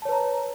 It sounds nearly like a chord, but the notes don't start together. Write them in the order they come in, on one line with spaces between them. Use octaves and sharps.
A5 C#5 B4 A#5